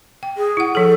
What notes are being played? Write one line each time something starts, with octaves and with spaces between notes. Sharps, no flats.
G5
G#4
E4 F#5
F3 G#4 A4